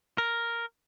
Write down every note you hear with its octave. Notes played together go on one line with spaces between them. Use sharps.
A#4